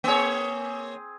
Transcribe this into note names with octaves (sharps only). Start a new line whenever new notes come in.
A#3 C4 G#4 C#5